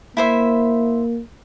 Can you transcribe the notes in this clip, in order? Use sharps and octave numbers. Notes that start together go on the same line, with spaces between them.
A#3 E4 C5 E5